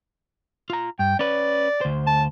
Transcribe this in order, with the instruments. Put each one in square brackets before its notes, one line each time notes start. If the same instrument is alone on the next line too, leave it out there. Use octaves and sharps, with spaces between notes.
[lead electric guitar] F4 A#5
[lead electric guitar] G2 [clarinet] G5
[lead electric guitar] C#4 B4 [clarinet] D5
[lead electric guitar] D2 C5
[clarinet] A5